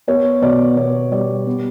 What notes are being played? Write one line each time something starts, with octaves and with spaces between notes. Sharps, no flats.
B3 C#5
B2 D5
B2 C#5
G3 D5
B3